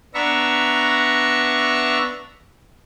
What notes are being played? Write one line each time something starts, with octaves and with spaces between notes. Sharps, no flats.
B3 D4 E5 A#5 C#6